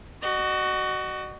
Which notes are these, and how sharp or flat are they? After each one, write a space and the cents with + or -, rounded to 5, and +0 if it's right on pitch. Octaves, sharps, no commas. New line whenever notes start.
F#4 +20 D#5 -35